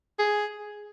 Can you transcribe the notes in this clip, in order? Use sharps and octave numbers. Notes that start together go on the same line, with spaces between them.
G#4